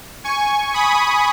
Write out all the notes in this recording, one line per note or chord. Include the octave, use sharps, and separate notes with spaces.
G#5 C#6
B5 D#6